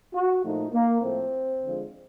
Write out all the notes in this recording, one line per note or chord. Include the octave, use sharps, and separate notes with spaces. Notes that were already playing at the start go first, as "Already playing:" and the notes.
F#4
A#2 F3 A3 D#4
A#3
A2 F3 A3 C4
D3 F3 G#3